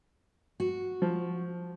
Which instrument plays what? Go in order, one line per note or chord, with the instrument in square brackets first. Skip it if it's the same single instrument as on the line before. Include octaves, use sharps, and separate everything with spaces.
[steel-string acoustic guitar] F#4
[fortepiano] F3